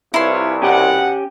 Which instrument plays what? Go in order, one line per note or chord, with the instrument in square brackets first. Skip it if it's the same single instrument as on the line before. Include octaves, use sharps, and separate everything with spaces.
[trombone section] C2 [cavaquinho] E4 C6 [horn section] F4 B4 C#5
[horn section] B2 F#5 [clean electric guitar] C#4 G4